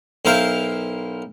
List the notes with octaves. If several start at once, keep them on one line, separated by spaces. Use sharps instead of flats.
B1 E4 A#4 C5 F5